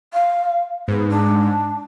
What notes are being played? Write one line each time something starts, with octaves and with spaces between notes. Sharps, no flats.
F5
G#2 B3
D4